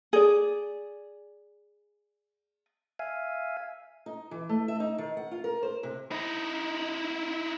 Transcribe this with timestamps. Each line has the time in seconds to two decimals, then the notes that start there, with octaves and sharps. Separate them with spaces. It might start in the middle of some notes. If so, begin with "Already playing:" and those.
0.13 G#4 D5
2.99 E5 F5 G#5
4.06 D#4
4.31 E3
4.49 A3
4.68 E5
4.80 D#4
4.98 D#3
5.17 F#5
5.31 F4
5.44 A#4
5.63 C5
5.83 C3
6.11 D#4 E4